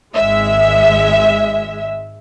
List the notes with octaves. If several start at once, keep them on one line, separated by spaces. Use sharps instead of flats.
G#1 G#3 E5